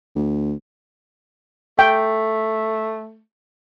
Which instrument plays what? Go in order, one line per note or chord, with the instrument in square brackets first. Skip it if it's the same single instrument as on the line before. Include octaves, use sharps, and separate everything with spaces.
[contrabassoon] D2
[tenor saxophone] A3 [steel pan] G5